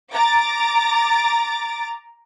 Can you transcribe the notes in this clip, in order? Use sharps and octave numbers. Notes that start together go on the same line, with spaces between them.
A#5 D6 A6